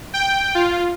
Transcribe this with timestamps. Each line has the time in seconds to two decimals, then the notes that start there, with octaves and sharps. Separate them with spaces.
0.14 G5
0.55 F4